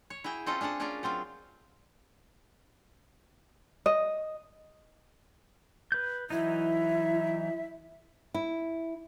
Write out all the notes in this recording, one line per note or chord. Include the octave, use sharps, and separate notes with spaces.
C#5
E4 F#4 G#4 G5
C4 C#4 F4 A4 D#5 A5
D4 G#4 F5 F#5 A5
C#4 D4 F4 G#4 A#4 D5
F#3 C4 F4 F5
D#5
B4 G6
E3 F#3 D#4 E4 E5
E4